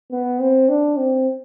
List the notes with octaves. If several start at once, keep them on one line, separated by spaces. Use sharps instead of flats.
B3
C4
D4
C4